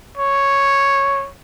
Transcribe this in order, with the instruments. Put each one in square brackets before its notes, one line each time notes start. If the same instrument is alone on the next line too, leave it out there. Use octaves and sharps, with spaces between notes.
[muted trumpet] C#5